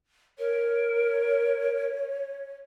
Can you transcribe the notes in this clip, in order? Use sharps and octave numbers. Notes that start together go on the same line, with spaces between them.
A#4 C#5